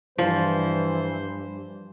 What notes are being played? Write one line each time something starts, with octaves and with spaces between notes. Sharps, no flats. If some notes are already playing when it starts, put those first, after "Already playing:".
G2 E3 F3 C5